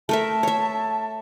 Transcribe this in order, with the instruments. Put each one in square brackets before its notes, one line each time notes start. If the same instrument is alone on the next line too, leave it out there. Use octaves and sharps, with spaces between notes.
[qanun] A3 A#4 E5 [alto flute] A5
[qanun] C#5 E5